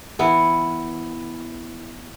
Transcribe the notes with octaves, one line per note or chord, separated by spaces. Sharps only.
E3 B3 E4